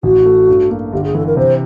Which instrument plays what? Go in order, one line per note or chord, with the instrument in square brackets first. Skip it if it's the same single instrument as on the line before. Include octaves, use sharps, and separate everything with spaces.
[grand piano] A1 [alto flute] F#4
[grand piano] A3
G2
A#3
[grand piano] G1 [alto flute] G4
[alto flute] G#4
[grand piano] E3 [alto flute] A4
[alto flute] A#4
[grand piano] C3 [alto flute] C5